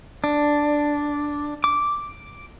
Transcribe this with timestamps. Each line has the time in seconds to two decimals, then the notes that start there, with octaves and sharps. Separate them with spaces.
0.24 D4
1.64 D6